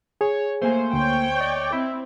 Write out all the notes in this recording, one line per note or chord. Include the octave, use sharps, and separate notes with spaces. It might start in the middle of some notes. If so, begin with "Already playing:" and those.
G#4 C#5
A3 A#3 C5 G#5
D2 C#5 G5
D5 D#5
C4 E4